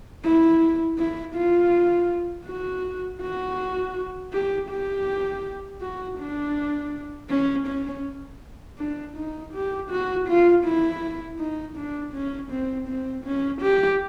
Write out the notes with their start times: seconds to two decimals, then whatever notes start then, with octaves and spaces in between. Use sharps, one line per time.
0.24 E4
0.98 E4
1.36 F4
2.46 F#4
3.22 F#4
4.33 G4
4.70 G4
5.81 F#4
6.18 D4
7.30 C#4
7.67 C#4
8.78 D4
9.16 D#4
9.54 G4
9.90 F#4
10.28 F4
10.64 E4
11.39 D#4
11.77 D4
12.13 C#4
12.51 C4
12.88 C4
13.25 C#4
13.62 G4